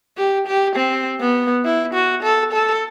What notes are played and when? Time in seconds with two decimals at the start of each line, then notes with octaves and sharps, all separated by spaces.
0.17 G4
0.47 G4
0.76 C4
1.20 B3
1.65 E4
1.94 F#4
2.23 A4
2.53 A4